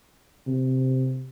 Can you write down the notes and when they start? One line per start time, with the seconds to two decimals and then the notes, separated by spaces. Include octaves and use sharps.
0.47 C3